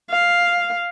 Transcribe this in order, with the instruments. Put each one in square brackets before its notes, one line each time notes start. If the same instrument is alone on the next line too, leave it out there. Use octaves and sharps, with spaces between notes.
[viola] F5